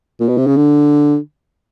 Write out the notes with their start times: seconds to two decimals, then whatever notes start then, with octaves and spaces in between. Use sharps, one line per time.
0.20 A#2
0.29 B2
0.38 C3
0.47 C#3
0.56 D3